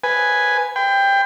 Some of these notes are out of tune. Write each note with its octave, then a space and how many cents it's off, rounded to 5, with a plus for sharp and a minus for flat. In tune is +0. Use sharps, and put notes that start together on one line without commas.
B4 +0 G#5 +0
G5 +15 B5 +45